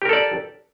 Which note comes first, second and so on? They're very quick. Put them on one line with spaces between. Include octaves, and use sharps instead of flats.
G4 A#4 A4 D5